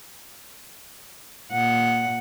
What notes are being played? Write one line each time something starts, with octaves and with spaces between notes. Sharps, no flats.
A#2 F#5